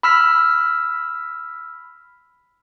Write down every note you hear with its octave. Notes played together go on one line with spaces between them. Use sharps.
B5 E6 F6 B6